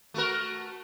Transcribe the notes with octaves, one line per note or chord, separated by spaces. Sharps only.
A3 F#4 A#4